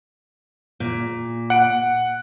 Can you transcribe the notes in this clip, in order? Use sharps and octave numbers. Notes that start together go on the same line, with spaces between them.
A#2
F#5 D7